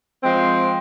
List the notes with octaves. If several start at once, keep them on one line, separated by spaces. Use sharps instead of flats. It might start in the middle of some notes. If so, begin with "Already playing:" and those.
F3 G#3 C4